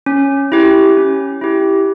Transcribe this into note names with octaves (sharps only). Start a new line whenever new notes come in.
C#4
E4 G4
C#4
E4 G4